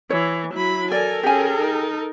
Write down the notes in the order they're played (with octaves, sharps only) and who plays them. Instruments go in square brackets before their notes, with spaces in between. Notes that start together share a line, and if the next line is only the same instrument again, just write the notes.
[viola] E3 [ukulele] C#5
[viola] F#3 B5 [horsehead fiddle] E4
[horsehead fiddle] A4 A#4 [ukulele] D5 [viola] G#5
[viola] C#4 G#4 [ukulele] G4 G#5
[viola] D#4